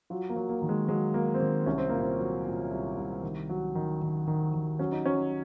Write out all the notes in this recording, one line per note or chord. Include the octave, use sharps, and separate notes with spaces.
F#3 F4
A#3
F#3
A#3
D#3
G#3
F#3 G#3
F#3 A#3
C4
D#3 A#3
C2 C#4
C4
A#2 A#3
C4
F#3
A#2
C2
C2
D#3
F#3
D#3
D#3
D#3
D#3
F#3 C#4
D#4
F#3 C#4